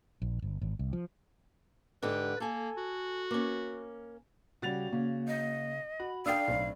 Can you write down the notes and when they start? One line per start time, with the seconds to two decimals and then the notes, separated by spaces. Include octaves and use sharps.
0.22 A#1
0.42 G1
0.62 G#1
0.79 C2
0.93 F3
2.02 G#2 D3 G4 B4
2.40 A#3 A4 G#5
2.77 F#4
3.31 A#3 C#4
4.62 C#3 G3 F#4 A6 F7
4.92 C#3 A#3
5.28 D#5
6.00 F#4 B5
6.26 D4 A4 F5 G5 D#6 E6
6.48 B1 A2 C4